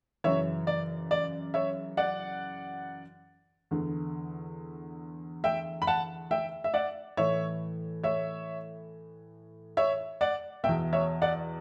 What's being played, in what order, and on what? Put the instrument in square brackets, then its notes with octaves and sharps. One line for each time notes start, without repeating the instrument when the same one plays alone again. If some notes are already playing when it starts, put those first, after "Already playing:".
[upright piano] F#2 C#3 E3 C#5 E5
D5
D5
C#5 E5
D5 F#5
E2 D3
E5 G5
B5
F#5 A5
E5 G5
E5
D5 F#5
A2 E3 C#5 E5
C#5 E5
C#5 E5
D5 F#5
B2 E5 G5
E2
C#5 E5
D5 F#5